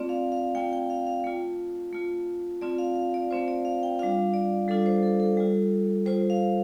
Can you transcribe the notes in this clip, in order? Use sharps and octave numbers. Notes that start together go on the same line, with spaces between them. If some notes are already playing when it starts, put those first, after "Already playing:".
Already playing: A3 C4 F4 D5
F5
F5
A3 C4 F4 G5
G5
F5
F5
A3 F4
A3 F4
A3 C4 F4 D5
F5
F5
D5
A3 C4 F4 C5
D5
F5
G5
G3 D4 F4 F5
D5
G3 D4 F4 A4
C5
A4
A4
G3 F4
G3 F4 C5
F5